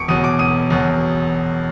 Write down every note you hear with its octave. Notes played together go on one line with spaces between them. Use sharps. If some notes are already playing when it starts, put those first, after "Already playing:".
Already playing: E1 C#6 D6 C#7 D7
E2 B2 F#3 D#6 D#7
D6 D7
E1 D#6 D#7
E2 B2 F#3